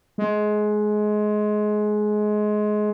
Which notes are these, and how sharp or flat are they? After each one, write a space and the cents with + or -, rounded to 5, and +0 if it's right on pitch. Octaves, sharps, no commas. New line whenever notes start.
G#3 +20